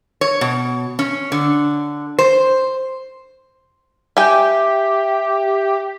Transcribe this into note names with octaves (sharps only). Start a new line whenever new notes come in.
C#5
B2
C#4
D3
C5
G4 E5 G5 G#5